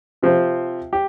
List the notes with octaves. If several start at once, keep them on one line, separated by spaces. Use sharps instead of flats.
C3 F3 C4
G4